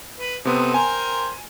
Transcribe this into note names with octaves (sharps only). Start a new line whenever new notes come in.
B4
C3 B3 C4 A4 D#6
A#4 C5 G5 G#5